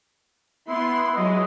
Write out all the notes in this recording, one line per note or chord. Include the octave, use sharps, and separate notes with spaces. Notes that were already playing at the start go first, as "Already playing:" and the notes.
B3 E4 C6
F#3 G#3 D#5